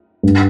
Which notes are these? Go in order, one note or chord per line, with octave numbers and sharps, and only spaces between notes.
G2